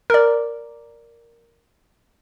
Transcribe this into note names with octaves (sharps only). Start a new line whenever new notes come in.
A#4 D5